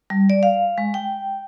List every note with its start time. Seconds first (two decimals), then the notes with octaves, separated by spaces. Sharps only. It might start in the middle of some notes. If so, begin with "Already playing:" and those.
0.10 G3
0.30 D5
0.43 F5
0.78 G#3
0.94 G5